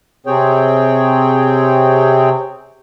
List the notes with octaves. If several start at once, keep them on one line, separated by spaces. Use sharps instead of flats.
C3 C4 G#4 C#5 G5